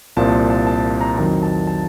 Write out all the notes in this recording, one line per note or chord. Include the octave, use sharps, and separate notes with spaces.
C2 A#2 F3 A5
A5
A5
A#5
F2 D#3 F#3 A#5
A5
A5